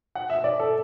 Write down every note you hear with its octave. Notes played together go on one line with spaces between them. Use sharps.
F#5
E5
D5
A4